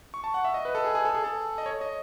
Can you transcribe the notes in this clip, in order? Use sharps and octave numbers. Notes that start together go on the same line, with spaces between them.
C#6
A5
F#5
E5
D#5
B4
A4
G#4
G#4
A4
G#4
A4
D#5
C#5
D#5